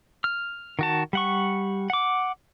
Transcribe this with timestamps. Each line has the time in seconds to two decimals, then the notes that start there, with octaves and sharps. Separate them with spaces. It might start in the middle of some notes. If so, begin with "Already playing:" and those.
0.24 F6
0.79 D#3 F#4 A5
1.13 G3 F#5 C#6
1.90 F#5 D6